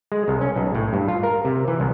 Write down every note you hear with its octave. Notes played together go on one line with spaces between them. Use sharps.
G#3
C2
C#4
B1
A2
G2
F4
A#4
C3
E3
C2